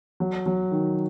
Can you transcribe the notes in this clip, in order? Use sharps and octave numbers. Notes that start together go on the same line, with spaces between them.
F#3
F#3
D#3